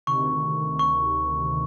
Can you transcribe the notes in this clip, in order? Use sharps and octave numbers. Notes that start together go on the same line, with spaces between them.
D2 C3 D#3 C#6
C#6